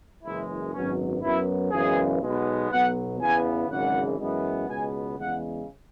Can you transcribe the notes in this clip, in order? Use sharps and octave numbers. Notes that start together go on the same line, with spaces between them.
F#1 F#2 E3 G#3 E4
G#1 F#2 F#3 B3 C#4
F#2 F#3 B3 E4
F#2 C#3 E3 G#3 B3 G#4
B1 B2 G#3 B3
B1 B2 F#3 B3 F#5
E2 C#3 E3 B3 G#5
G#1 F#2 C#3 E3 G#3 F#5
F#2 E3 G#3 B3
C#2 B2 G#3 B3 G#5
E2 C#3 G#3 F#5